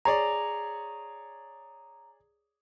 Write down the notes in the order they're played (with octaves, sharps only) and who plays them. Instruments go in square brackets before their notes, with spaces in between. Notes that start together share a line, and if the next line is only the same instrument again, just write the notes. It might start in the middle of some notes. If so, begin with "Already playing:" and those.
[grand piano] G#4 C#5 D5 [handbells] A#5